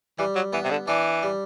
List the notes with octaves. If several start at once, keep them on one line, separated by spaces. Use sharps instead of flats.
E3 G3
F#3
E3 B3
C3
D3
E3 D4
G3